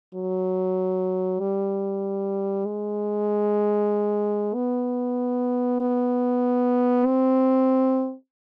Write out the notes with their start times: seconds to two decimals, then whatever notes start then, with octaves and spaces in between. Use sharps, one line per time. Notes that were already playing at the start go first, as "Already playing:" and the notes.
0.14 F#3
1.40 G3
2.66 G#3
4.54 B3
5.80 B3
7.06 C4